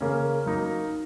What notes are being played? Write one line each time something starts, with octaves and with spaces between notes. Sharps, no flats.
C#3 A#3 C#4
F#3 A#3 D#4